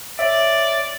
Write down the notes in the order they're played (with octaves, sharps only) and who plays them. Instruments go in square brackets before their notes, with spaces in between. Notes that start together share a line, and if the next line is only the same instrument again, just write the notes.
[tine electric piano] C#5 E5 [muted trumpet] D5